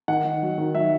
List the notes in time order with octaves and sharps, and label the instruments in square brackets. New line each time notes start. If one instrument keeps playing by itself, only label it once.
[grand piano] D#3 F#5
D#3
F#3
D#3
F#3 E5